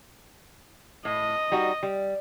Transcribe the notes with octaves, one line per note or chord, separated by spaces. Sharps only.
A2 D#5
G3 D#4 F#4
G3